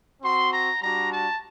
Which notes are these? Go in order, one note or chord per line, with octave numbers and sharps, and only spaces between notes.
C4 F#4 C6
A#5
G3 D4 F#4 A#5
A5